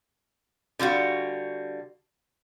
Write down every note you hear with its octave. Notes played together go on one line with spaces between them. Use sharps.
D3 G3 F4 F#4